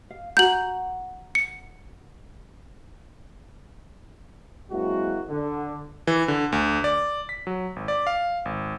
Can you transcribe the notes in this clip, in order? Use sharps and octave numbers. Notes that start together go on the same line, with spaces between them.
F5
F#4 F#5 A#5 G6 F#7
C#7
F#3 G#3 A#3 C4 E4 F#4
D3
E3
D3
D2
D5
B6
F#3
G#1
D5
F5
G#1